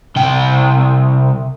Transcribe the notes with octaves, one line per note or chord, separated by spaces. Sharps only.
C2 G5